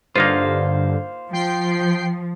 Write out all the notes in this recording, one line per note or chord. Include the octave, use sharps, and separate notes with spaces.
G2 D3 A#3 D#4 F4 C5 F5
F3 G5 C7